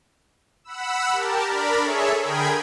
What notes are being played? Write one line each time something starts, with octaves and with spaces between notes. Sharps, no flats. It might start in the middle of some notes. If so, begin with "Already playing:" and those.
F#5 B5 E6
G4 A#4 A5
D4 A#4 D5 B5
G#4 A4 C#5 E5
D3 G#4 A#4 G5 B5 G#6